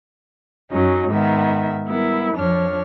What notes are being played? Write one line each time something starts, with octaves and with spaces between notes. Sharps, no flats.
F#2 F#3 C#4 D#4
G#2 D#3 B3 E5
G3 B3 E4 A#4
F2 F3 D4 C#5 F6